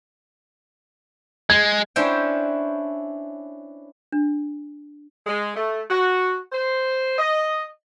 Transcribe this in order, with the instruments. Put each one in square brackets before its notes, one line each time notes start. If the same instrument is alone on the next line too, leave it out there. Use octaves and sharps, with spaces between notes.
[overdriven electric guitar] G#3 [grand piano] G#6
[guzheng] C#4 D4 E4 B4 C5 G5
[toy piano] D4
[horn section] G#3
A3
F#4
C5
D#5